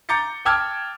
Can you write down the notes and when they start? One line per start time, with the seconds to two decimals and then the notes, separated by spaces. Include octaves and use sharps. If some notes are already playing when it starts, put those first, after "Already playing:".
0.09 A#5 D6 G6 A6 C#7
0.45 G5 A5 D6 E6 F6 G#6